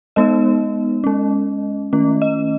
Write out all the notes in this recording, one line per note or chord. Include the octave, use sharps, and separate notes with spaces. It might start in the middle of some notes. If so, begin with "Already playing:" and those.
G#3 B3 D#4 D#5
G#3 C#4
D#3 A3 C#4
D#5